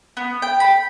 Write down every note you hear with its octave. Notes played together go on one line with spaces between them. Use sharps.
B3
G5
B5